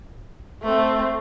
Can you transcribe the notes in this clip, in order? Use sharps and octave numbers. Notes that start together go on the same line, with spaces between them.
A3 C4